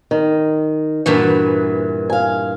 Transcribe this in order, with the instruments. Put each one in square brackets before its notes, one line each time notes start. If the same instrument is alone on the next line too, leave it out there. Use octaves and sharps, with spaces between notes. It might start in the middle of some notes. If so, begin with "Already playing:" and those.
[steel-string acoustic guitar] D#3
[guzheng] G2 A#2 E3 [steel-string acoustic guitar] F#4
[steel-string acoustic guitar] F5 G#5